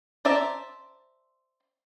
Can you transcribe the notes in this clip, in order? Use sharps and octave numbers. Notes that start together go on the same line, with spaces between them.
C5 D5 E5 A5 A#5